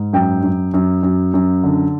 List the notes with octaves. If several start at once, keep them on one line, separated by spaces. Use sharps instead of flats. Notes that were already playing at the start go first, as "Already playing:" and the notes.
Already playing: G#2
F#2 G5
F#2
F#2
F#2
F#2
D3